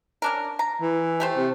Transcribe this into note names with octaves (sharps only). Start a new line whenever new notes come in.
C#4 D4 A#4
A#5
E3
A3 G4 C5
C3